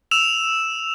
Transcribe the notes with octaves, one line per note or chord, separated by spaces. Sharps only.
E6 E7 F7